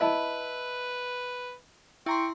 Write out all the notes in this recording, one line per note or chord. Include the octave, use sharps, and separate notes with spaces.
E4 B4 D#5 A5 B5
E4 G5 A#5 C6 C#6